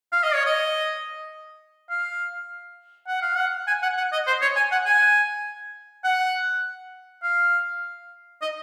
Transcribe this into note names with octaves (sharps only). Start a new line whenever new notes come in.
F5
D#5
C#5
D#5
F5
F#5
F5
F#5
G#5
F#5
F#5
D#5
C5
C#5
G#5
F#5
G#5
F#5
F5
D#5